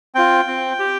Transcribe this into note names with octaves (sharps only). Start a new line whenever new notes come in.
C4 F4 G5
C4
G4